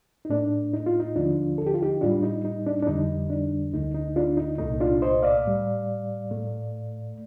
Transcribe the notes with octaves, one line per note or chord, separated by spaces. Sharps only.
D#4
A2 A3 D4
D#4
F4
D#4
D#2 D3 F3 D4 F4
A4
G4
F4
D#4 G4
A2 G3 D4 F4
D#4
D#4
D4
D4
F2 D3 G3 D#4
D4
D2 D3 A3 D#4
D#4
D4 F4
D#4
C2 A#2 A3 D#4
D4 F4
C5 D#5
D5 F5
A2 G3
A2 A3